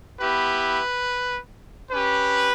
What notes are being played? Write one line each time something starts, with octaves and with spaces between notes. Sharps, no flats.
B3 E4 G4 B4
C#4 G4 B4